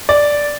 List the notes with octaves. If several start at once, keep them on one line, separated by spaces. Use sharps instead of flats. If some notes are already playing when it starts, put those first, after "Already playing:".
D5